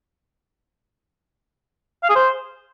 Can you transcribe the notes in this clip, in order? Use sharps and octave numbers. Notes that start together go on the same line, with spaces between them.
F5
G#4
C5